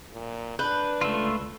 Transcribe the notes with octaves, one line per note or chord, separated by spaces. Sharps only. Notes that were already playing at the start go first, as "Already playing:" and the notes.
A#2
D4 B4 F#6 G6
C#2 A3 F4 E6